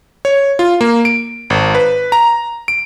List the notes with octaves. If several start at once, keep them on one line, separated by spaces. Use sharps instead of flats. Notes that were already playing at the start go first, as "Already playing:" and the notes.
C#5
F4
A#3
D7
G#1
B4
A#5
D7